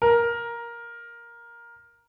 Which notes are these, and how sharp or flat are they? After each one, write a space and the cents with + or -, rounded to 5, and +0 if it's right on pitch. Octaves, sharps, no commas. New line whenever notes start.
A#4 +10